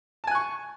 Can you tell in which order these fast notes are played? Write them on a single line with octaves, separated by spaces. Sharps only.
A5 G#5 F#6 C#6